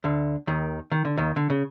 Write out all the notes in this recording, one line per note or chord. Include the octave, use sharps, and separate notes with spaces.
D2 D3
D#2 D#3
D#3
D3
D#2 D#3
D3
C#3